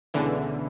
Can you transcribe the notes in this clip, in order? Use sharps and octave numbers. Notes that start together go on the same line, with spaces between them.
C#2 B2 D3 E3 G#3 C#4 E4